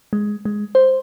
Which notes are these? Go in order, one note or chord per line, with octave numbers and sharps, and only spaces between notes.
G#3
G#3
C5